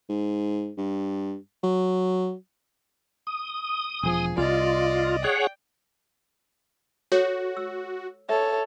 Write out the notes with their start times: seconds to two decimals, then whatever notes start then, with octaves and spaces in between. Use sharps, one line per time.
0.09 G#2
0.77 G2
1.64 F#3
3.27 D#6
4.03 E1 F3 G#4
4.38 C2 F4 D5 D#5
5.24 G#4 C#5 F#5 G5
7.12 F#4 A4 C#5 F#5
7.57 E6
8.29 A4 C#5 E5